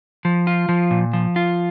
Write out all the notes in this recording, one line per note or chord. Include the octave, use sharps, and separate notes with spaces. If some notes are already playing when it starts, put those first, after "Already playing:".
F3
F4
F3
A#2
F3
F4